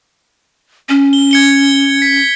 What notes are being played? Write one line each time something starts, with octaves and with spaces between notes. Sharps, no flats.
C#4
G7
G#6 C#7 G7
B6